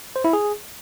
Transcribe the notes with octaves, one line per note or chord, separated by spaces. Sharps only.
C5
E4
G#4